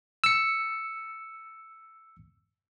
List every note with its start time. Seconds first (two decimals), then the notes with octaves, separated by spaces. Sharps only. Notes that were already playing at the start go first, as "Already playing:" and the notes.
0.24 E6 C#7